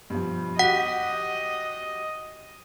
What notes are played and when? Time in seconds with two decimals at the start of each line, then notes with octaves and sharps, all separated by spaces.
0.10 G2 B2 F3
0.59 F#4 G4 D#5 F#5 B6